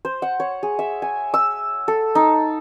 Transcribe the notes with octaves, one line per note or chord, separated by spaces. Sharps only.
C5
F#5
C#5
G#4
E5
G#5
E6
A4
D#4